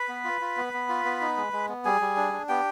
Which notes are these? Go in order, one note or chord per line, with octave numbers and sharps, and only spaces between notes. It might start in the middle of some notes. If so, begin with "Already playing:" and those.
Already playing: B4 B5
B3
F4
F4
B3
B3
F4
B3
D#4
G#3
G#3
B3
G3 G#4 G#5
G3
D4
D4
B3 G4 G5